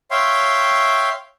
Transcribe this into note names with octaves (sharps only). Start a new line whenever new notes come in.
C#5 E5 F5 G5 C6